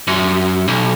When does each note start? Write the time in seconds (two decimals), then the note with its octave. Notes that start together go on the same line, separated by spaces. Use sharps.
0.07 F#2
0.68 B1